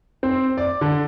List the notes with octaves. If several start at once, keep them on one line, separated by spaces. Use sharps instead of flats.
C4
D5
D3